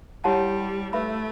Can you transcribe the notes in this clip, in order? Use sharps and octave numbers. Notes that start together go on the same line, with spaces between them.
G3 E4 G4 C#5 F#5 A5
A3 B4 E5 B5